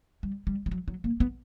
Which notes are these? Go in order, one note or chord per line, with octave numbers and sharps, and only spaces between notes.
G3
G3
G3
F#3
F#3
A#3
B3